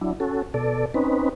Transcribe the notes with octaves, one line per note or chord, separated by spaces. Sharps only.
F#3 D4 E4
C#4 F#4 A4
B2 A4 D5
C4 C#4 D#4 B4